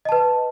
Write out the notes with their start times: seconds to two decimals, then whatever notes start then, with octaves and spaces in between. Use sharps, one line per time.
0.05 D#5
0.09 A5
0.12 B4